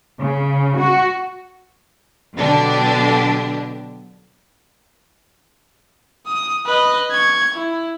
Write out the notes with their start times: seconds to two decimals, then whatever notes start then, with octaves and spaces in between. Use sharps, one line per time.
0.21 C#3
0.79 F#4
2.35 B2 D3 F#3 D4 G4
6.27 D#6
6.66 B4 D#5
7.11 C#6 G#6
7.54 E4